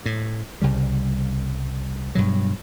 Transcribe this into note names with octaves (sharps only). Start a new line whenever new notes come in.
A2
C2 C#3 G3
G2 B2 F#3